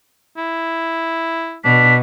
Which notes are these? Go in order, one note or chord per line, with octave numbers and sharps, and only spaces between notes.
E4
B2 D4 B6